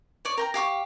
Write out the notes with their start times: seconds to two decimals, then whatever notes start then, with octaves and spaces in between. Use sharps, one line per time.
0.25 C#5 D5 C#6
0.37 A#4 G5 A#5
0.54 G4 F5 C#6 D6